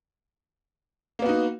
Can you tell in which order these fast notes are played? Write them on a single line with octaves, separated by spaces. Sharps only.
A#3 B3 F#4 D#4